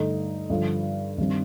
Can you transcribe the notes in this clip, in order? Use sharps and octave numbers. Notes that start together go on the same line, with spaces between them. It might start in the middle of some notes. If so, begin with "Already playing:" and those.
Already playing: G2 D3 A3 D#4
G2 D3 F3
G2 D#3 G3 C4